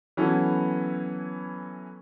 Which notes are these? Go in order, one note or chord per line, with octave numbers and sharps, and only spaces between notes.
E3 F#3 B3 C#4 E4 A4